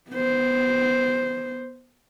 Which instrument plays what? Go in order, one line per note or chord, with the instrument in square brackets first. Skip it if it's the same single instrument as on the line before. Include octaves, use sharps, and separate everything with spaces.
[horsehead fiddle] B3 C5